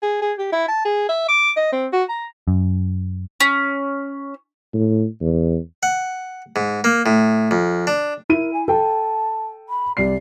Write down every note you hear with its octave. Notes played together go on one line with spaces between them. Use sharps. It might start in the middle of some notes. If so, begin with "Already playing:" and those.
G#4
G#4
G4
E4
A5
G#4
E5
D6
D#5
C4
F#4
A#5
F#2
C#4
A2
E2
F#5
G#2
A#3
A2
F2
D4
E4 A#4 D#7
G#5
A4 G5 A5
B5
C2 D5 C7